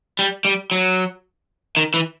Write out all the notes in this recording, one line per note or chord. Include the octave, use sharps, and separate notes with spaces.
G3
G3
F#3
D#3
E3